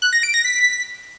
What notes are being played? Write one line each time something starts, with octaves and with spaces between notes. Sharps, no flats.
F#6
A#6
D7
A#6
B6